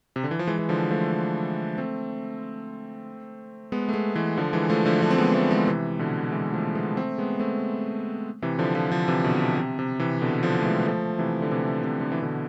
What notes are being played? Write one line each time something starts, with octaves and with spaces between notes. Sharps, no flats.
C3
D3
E3
F3
E3 G#3
E3
D3 F3
F3 A3
A3 C4
G#3 B3
A3
G#3 B3
E3 G#3
D3 F3
E3 G#3
F3 A3
D3 F3
D3 F3
C4
G#3 B3
B3
F3 A3
E3 G#3
C3 E3
B2 D3
E3 G#3
F3 A3
G#3 B3
A3 C4
G#3 B3
A3 C4
C3 E3
D3 F3
D3 F3
D3 F3
C3 E3
B2 D3
C3
C3
C3
C3 E3
B2 D3
D3 F3
A3
E3 G#3
B3
F3 A3
C3 E3
D3
C3 E3
C3
D3
E3
B2 D3